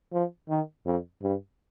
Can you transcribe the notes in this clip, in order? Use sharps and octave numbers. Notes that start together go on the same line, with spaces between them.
F3
D#3
F2
G2